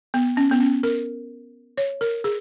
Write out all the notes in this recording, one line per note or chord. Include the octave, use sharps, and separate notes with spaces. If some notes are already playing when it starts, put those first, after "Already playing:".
B3
C#4
B3
C#4
A#4
C#5
A#4
G#4